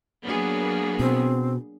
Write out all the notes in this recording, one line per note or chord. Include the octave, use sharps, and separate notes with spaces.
F#3 A#3 B3 D4 G#4
B2 C4